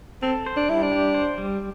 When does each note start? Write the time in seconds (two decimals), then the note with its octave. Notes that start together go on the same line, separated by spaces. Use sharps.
0.22 C4 A4
0.46 C5
0.57 D4
0.69 G3 E4
0.83 D4
0.92 G4
1.14 C5
1.38 G3